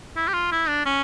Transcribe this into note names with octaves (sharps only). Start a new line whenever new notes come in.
E4
G4
F4
E4
D4
C#4